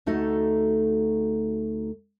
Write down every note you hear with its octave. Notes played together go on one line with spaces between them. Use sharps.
D2 A3 D#4 F#4 A4 D#5